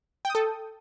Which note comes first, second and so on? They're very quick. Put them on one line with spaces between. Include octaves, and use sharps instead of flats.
G5 D#6 A4